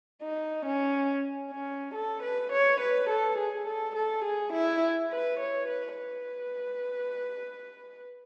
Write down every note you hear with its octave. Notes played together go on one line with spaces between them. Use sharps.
D#4
C#4
C#4
A4
B4
C#5
B4
A4
G#4
A4
A4
G#4
E4
B4
C#5
B4
B4